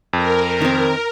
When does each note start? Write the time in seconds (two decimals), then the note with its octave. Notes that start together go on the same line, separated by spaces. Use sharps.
0.13 F2 A#4
0.61 D#3 C4